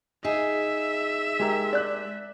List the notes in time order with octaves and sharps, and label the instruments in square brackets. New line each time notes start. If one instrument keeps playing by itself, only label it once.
[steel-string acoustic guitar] D#4 G#4 [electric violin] E5
[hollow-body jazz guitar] G#3 G4 A#4
[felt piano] D5 F#6